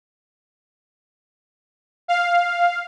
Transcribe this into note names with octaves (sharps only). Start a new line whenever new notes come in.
F5